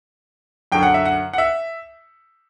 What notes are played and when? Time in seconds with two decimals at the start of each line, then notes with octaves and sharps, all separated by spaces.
0.72 F#2 D3 F#3 G5
0.83 F#5
0.94 E5
1.05 F#5
1.33 F#5
1.38 E5